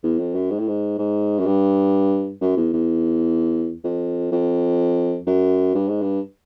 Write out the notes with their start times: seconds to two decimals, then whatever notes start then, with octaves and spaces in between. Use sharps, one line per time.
0.03 E2
0.19 F2
0.35 F#2
0.51 G#2
0.59 A2
0.68 G#2
0.98 G#2
1.39 F#2
1.46 G2
2.41 F#2
2.57 E2
2.73 E2
3.84 F2
4.32 F2
5.27 F#2
5.75 G2
5.88 G#2
6.02 G2